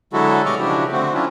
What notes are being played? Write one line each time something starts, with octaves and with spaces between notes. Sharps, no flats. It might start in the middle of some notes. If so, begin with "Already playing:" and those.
D3 F#3 G#3 E4 F#4 A4
B2 G3 D#5 C#6 D6 F6
C#3 F3 D4 E4 F#4 G4
D3 A3 C4 F#4
F#3 C#4 D4 E4 F4